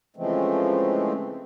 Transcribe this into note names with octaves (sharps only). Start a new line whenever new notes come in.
C#3 E3 F3 G#3 A3 C4